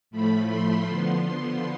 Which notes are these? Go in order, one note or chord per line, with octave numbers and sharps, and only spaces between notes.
A2 F3 A3 B5
C6
D3 F3 B3